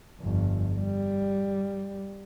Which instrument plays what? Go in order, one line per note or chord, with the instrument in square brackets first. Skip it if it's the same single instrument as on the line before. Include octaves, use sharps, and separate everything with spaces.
[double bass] G1 F2
G3